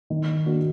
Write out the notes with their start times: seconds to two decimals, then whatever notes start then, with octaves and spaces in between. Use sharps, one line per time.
0.10 D#3
0.46 A#3 D4 F#4